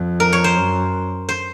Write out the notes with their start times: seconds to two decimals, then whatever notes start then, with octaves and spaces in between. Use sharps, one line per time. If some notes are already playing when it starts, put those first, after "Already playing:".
Already playing: F2
0.20 A#4
0.33 C#5
0.44 C5
0.56 F#2
1.29 C5